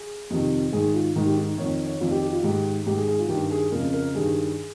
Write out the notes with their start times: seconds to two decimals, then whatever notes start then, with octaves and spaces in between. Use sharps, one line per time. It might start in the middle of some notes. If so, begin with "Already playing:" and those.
Already playing: G#4
0.30 F2 C3 D#3
0.72 G#2 D#3 G#4
0.94 F4
1.16 G#2 D#3
1.26 G4
1.37 D#4
1.58 F2 D#3 C#5
1.86 C#5
2.01 F2 D#3 F4
2.11 G4
2.22 G4
2.33 F4
2.43 G#2 D#3 G4
2.86 G#2 D#3 G4
2.97 G#4
3.08 G#4
3.19 F4
3.28 G2 D#3 G4
3.51 G#4
3.72 F2 C#3 A#4
3.93 A#4
4.15 G2 D#3 G#4